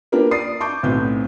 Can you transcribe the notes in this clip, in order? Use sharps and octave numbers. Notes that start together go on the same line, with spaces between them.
A#3 D4 F4 G4 A#4 B4
D5 D#6 A6 C7
A5 C#6 D6 G6
B1 A2 B3 C4 G6